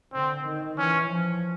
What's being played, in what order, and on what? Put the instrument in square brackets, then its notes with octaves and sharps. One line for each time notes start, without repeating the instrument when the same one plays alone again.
[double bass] D3 [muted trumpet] C4
[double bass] D#3
[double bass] E3 [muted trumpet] C#4
[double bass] F3